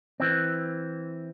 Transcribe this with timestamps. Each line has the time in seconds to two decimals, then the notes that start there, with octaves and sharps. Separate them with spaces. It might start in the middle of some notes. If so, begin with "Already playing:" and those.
0.20 E3 C4